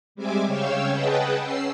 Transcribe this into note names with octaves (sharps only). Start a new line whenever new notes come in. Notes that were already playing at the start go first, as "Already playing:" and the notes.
G3 G#3 C4 E5 G#5 D6
C#3 C#5 F5 G5 E6
G#4 B4 D#5 F#5 G5 A5
C#4 E6 C7